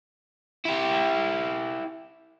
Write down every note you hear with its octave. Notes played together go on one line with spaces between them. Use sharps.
E4 G4